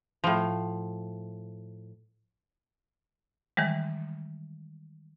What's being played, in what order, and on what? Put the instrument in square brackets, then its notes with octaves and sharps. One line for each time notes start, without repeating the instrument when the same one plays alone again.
[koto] A2 F3
[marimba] D#3 E3 G3 G#3